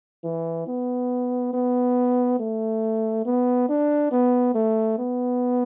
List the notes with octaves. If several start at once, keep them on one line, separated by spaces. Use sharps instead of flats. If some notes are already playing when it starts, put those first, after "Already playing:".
E3
B3
B3
A3
B3
D4
B3
A3
B3